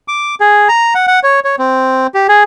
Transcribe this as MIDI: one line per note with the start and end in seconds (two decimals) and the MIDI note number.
0.08 0.35 86
0.40 0.68 68
0.68 0.94 82
0.95 1.07 78
1.07 1.20 78
1.23 1.40 73
1.44 1.56 73
1.59 2.07 60
2.14 2.27 67
2.29 2.43 68